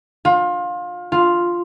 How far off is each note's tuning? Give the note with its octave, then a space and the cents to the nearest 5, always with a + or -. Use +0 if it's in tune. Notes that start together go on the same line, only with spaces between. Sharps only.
F4 +25
F4 +0